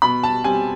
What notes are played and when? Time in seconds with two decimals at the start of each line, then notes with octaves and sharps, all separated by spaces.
0.02 B2 B5
0.23 A5
0.44 G3 C4 G#5